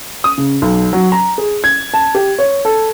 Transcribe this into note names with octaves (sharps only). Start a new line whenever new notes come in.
D#6
C#3
B1
F#3
A#5
G#4
G#6
A5
G4
C#5
A4